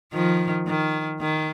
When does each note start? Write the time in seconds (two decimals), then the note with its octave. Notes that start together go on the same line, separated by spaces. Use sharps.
0.13 D#3 F3
0.67 D#3
1.20 D#3